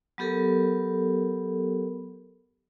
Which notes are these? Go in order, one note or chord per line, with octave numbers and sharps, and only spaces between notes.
F#3 B3 G4 A4 A#4